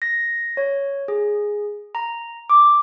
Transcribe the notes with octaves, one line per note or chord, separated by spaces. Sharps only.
A#6
C#5
G#4
A#5
D6